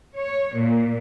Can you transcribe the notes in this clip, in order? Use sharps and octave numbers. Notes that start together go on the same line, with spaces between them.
C#5
A#2